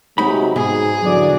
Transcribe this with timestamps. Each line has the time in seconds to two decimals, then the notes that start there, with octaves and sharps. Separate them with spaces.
0.18 C3 F#3 G#3 D#4 B5
0.56 G#2 B2 G#4
1.03 E2 D3 F#3 D5